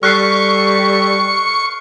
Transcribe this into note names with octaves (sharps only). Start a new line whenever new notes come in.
G3 A4 C#6 F6 F#6 C7